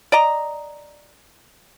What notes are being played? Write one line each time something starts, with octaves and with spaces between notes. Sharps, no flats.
D5 D#5 A#5